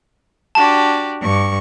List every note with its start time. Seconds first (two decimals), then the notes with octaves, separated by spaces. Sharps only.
0.55 D4 F#4 G4 A5
1.21 G2 C#6